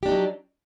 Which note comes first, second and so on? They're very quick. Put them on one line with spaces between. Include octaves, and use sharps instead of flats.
G4 D4 D#4 F#3